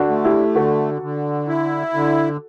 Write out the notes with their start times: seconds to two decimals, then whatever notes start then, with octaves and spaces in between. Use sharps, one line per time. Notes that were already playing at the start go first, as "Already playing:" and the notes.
Already playing: D3 D4 F#4
0.09 A3
0.25 E4 G4
0.56 D3 F#4 A4
1.02 D3
1.48 E4
1.94 D3